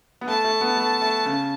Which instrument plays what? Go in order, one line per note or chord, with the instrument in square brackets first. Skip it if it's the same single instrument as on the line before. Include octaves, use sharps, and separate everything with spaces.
[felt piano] B3
[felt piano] A3 [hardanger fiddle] A5
[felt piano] A3
B3
A3
A3
C#3